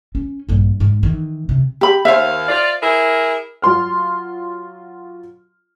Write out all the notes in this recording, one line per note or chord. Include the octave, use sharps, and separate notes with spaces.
C#4
A#1 G2
G#2 G#3
D#3 E3
C3
G4 B5
D#2 C5 E5 F5
F4 D5
E4 G#4 A#4
F#3 F4 C6 F6